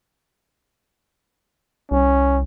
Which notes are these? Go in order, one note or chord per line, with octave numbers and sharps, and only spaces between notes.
C2 C#4